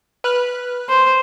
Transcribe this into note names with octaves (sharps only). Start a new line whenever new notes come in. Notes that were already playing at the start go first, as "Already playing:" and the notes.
B4 F6 F#6
C5